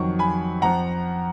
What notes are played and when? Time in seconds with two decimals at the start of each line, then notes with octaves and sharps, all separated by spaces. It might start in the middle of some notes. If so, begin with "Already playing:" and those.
Already playing: F2 D#3 F#3 C#6
0.19 G#5 B5
0.62 F2 F3 F#5 A#5